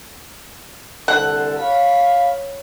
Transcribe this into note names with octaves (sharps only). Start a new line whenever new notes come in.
C2 D3 A4 C5 F#5
C#5 F5 B5